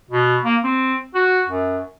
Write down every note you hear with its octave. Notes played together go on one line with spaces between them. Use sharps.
B2
A#3
C4
F#4
F#2